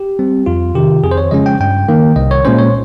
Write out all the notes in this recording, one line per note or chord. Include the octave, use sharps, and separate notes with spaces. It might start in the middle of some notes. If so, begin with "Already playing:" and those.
Already playing: G4
G3 C4
F2 F4
C3 D#3 G4
F2 G#4
C5
C#5
C#3 F3 G#3 C#4 D#5
G5
G2 G5
D#3 A#3
C2 D#5
C#5
A#2 G#3 C#4 C5
C#5